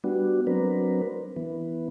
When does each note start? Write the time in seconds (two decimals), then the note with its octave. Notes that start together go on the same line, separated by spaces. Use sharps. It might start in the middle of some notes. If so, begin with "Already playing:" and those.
0.04 G3 B3 D4 F#4
0.47 F#3 C4 D4 A#4 B4
1.36 E3 B3